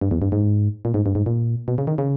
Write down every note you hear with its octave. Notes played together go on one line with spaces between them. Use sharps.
G2
E2
G2
G#2
A#2
G#2
G2
G#2
A#2
B2
C#3
D#3
C#3